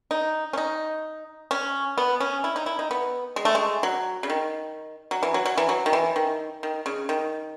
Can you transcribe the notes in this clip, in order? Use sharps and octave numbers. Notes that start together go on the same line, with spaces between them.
D#4
C#4
D#4
C#4
B3
C#4
E4
D#4
E4
D#4
B3
G#3
A3
G#3
F#3
C#3
D#3
F#3
E3
F#3
F#3
E3
F#3
D#3
E3
D#3
D#3
C#3
D#3